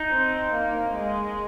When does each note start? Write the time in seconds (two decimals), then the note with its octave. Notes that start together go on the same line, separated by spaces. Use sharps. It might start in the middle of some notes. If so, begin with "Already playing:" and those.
Already playing: D#4
0.11 C4
0.53 A#3
0.95 G#3